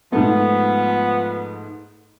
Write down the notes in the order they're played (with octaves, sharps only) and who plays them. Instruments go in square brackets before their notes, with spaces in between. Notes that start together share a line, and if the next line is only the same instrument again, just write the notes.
[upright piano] G#2 A3 [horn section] F3 B3